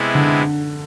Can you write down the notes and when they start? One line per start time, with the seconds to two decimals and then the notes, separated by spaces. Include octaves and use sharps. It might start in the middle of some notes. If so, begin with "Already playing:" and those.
Already playing: C3 G#3 B3 E4
0.15 D3